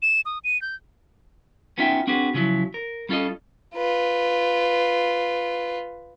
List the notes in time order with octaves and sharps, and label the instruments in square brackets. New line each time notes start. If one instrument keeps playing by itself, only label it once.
[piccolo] E7
D#6
D#7
G6
[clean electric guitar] B3 C#4 D#4 F4 E5 G5
C4 D4 F#4 G#4 B4
C#3 F3 F#3 E4
A#4
G3 C#4 F4 A4 D#5
[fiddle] F4 B4